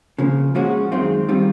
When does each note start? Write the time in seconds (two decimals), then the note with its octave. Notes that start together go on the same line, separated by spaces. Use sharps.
0.18 C#3 F3 A#3
0.55 A#2 F3 G#3 C#4 F#4
0.92 F#2 D#3 G#3 C4 F4
1.28 D#3 G3 C4 F4